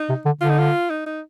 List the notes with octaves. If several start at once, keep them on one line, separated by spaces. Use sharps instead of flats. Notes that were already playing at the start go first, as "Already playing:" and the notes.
Already playing: D#4
C3
D3
D3 F4
D#4
F4
D#4
D#4